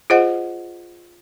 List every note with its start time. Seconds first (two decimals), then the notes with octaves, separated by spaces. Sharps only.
0.10 F4 G#4 C5 D#5 F#5